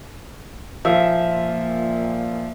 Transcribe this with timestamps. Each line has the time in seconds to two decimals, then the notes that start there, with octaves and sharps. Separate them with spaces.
0.85 A#2 F3 E5